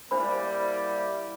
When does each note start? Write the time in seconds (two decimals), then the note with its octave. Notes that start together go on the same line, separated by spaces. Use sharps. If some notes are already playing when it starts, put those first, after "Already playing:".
0.11 G3 A#3 D4 E4 C5 B5